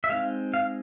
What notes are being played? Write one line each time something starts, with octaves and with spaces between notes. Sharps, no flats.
E5
G#3 C4 D#4 F5
F5